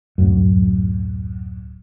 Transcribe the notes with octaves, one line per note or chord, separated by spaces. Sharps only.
D1 F#2